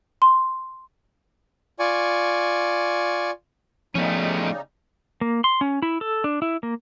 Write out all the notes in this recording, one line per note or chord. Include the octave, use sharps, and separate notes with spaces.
C6
F4 D5 G#5 C#6
C#3 F3 G3 A3 B3 C#4 D#4
A#3
C6
C#4
E4
A4
D4
E4
A#3